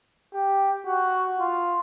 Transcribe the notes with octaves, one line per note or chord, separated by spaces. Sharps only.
G4
F#4
F4